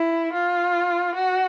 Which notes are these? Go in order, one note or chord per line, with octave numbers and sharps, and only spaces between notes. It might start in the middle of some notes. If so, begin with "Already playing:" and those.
Already playing: E4
F4
F#4